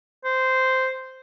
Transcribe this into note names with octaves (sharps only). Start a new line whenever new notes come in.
C5